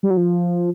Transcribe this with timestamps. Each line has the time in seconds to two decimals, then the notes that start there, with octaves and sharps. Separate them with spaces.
0.03 G3
0.10 F#3
0.17 F3